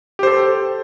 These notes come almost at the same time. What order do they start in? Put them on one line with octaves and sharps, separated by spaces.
G4 C5 A4